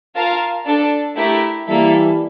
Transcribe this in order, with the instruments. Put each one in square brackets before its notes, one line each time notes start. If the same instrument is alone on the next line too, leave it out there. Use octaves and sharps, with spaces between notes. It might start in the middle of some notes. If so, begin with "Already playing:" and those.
[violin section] F4 A#4 F5 A5
D4 A4 D5 A5
A3 E4 G4 A#4 E5
[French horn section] E3 G3 [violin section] A#3 E4 A4 E5